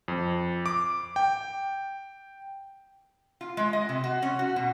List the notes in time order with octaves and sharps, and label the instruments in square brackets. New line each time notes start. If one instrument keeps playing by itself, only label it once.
[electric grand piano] F2
D6
G5
[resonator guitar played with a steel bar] F4
G#3
D#5
C3
F#4
C#4
F#4
B2